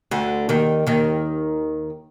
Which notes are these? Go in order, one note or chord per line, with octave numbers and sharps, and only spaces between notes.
D2 D3
D#2 D#3
D#2 D#3